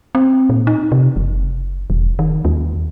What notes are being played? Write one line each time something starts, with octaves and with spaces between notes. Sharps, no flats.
C4
A#2
D#4
C3
F#1
E1
D#3
D#2